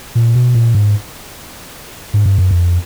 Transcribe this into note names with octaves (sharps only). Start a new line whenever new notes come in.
A#2
B2
A#2
G#2
G#2
G2
F#2
F2